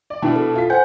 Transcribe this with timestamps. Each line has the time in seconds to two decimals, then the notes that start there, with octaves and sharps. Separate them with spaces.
0.10 D5
0.22 B2 D4 E4 A5
0.36 A4
0.55 F4 B6
0.70 C5 F#5 G#5 G6